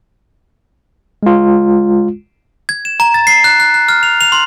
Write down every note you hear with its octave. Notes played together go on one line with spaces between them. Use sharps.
G#3 F4
G#6
E7
A#5
A6
C7
F#6
F#6
F#6
F6
F7
F7
C6